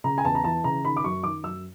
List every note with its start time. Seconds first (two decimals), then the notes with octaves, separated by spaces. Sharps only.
0.04 C#3 A#5
0.18 G#5
0.24 E2 A5
0.35 A#5
0.44 E3 A5
0.64 C#3 A#5
0.85 D#3 B5
0.97 D6
1.04 F#2 C#6
1.23 D#3 D6
1.44 F#2 E6